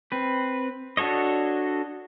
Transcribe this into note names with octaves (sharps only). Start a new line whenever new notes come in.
C4 B4
D4 F#4 A4 C#5 D#5